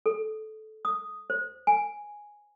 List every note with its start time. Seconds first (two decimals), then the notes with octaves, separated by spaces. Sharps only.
0.06 A4
0.85 D#6
1.30 C5
1.67 G#5